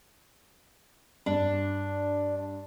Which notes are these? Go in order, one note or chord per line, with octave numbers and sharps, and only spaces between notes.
G2 D4